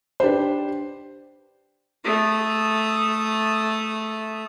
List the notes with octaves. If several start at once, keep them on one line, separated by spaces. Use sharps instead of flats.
D4 G4 B4 C5
A3 D#6